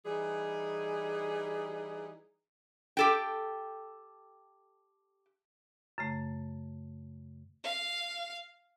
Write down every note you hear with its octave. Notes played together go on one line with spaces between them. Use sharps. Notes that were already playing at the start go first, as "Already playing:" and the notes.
E3 G3 D#4 G#4
G4 A4 G5
F#2 C#3 A3
F5